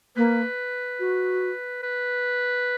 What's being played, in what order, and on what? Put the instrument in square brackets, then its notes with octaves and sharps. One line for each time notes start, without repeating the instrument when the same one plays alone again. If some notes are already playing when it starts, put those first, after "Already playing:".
[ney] A#3 [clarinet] B4
[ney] F#4
[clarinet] B4